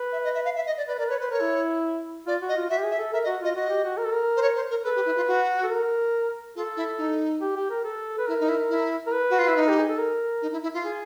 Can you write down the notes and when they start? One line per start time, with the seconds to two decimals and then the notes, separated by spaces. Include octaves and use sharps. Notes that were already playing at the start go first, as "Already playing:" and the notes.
Already playing: B4
0.12 E5
0.24 D#5
0.34 E5
0.45 F5
0.56 E5
0.66 D#5
0.77 D5
0.88 B4 D5
0.98 A#4 D5
1.09 B4 C#5
1.19 B4 C5
1.31 A#4 C#5
1.41 E4
2.27 F4 D5
2.42 F#4
2.48 D#5
2.56 F4
2.70 F#4 E5
2.79 G4
2.84 G#4
2.91 E5
2.98 A4
3.13 A#4 E5
3.24 D#5
3.26 F#4
3.42 F4 D#5
3.56 F#4 D#5
3.70 G4
3.84 F#4
3.98 A#4
4.05 A4
4.13 A#4
4.36 C5
4.42 C#5
4.56 C5
4.70 A#4
4.84 A4 B4
4.95 G4
5.05 E4
5.16 F4
5.27 F#4
5.63 A4
5.70 A#4
6.55 F4 A4
6.76 E4
6.98 D#4
7.41 G4
7.56 G4
7.70 A#4
7.84 A4
8.18 B4
8.27 E4 A#4
8.39 D#4
8.48 E4
8.70 E4
9.06 A#4
9.13 B4
9.30 F#4
9.38 F4
9.48 E4
9.56 D#4
9.68 G4
9.78 G#4
9.89 A4
9.98 A#4
10.42 D#4
10.52 E4
10.62 E4
10.74 F4
10.84 G#4